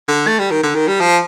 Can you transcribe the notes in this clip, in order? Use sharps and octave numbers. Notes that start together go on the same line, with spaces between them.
D3
A3
G3
D#3
D3
D#3
G3
F3